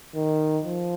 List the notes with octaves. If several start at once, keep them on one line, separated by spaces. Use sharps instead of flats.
D#3
F3